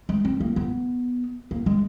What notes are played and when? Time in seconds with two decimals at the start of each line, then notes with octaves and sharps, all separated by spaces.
0.09 G#3
0.25 C4
0.40 A#3
0.56 B3
1.51 A#3
1.66 G#3